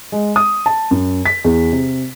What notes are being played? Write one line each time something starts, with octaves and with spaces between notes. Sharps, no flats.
G#3
D#6
A5
F#2
B6
E2
C3